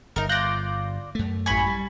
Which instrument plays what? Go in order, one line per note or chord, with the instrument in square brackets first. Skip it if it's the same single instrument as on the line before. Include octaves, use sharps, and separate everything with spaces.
[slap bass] G1 [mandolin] D#4 A#4
[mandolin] F4 D5 [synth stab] F#6 G6 A#6
[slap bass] F#2 A3
[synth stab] A1 G#5 [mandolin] B5 C#6
[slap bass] G3